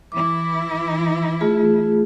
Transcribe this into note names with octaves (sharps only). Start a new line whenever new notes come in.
E3 E4 D6
A3 F4 G#4